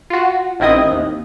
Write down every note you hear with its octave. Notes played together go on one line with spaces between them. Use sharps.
F4 F#4
A1 D#3 C4 E4 D#5 D#6
D#2